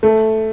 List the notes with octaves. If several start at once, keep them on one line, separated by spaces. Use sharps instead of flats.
A3